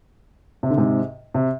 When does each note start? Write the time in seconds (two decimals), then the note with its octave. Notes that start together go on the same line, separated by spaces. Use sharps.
0.63 C3
0.70 D3
0.77 G#2 C3
1.34 C3